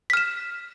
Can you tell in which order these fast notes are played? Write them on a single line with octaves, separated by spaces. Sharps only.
B6 F6 E7